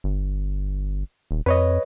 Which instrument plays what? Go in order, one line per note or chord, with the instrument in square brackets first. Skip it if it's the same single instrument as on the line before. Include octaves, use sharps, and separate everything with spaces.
[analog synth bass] G1
D#1
[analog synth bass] F2 [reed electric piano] B4 C#5 D#5